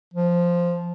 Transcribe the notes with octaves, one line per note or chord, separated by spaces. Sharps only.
F3